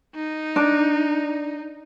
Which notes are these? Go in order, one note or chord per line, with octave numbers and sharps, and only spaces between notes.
D#4
D4